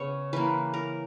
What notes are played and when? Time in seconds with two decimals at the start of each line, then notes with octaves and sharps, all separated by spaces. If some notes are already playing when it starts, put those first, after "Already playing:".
Already playing: C#3 B3 C#5
0.33 E3 A#3 B4
0.74 A#4